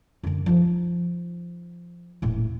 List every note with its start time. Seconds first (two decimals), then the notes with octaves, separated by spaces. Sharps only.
0.23 F#2 D3
0.46 F3 D#4
2.22 D#1 A2